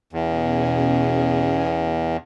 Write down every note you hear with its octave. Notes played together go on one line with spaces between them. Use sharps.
E2 B2 C#4 G#4